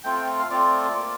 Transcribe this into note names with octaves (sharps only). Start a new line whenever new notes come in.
A3 C4 F4 G5
G5
F5
A3 C4 F4 D5
A#3 F4